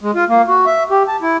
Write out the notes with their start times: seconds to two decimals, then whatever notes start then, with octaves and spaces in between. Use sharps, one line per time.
0.01 G#3
0.15 F4
0.29 A#3
0.48 F#4
0.66 E5
0.90 G4
1.08 A5
1.22 E4